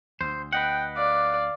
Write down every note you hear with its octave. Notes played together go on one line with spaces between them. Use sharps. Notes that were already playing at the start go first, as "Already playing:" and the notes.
D2 C5
B4 D#5 F#5 G5
D5 F5